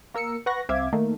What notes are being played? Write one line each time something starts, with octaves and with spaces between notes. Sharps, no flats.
A#3 A#4 E6 C#7
B4 F#5 C#6 F#6 A#6
C2 C4 E5 F5 D6 G#6
D#3 A3 A#3